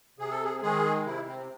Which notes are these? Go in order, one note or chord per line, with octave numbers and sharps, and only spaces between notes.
C3 G#4
A4
G#4
D#3 G#3 G#4
C3 E4
C4